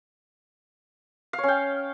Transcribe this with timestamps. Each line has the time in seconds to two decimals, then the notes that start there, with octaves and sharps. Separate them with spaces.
1.33 F5
1.38 C#5
1.43 C#4
1.48 G5